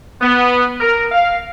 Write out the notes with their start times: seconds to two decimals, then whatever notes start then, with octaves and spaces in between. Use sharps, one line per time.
0.21 B3
0.80 A#4
1.12 F5